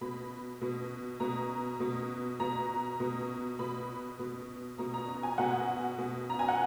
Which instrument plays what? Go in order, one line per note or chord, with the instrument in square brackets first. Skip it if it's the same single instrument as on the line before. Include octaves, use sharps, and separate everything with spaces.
[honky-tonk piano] B2 B5
B2
B2 A#5
B2
B2 A#5
B2
B2 B5
B2
B2 A#5
A#5
A#5
G#5
B2 F#5
B2
A#5
G#5
F#5